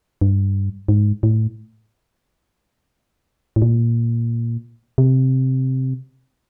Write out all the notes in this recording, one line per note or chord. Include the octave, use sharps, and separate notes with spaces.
G2
G#2
A2
A2
A#2
C3